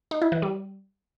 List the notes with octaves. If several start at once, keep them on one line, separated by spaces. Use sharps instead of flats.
D#4
E4
E3
G3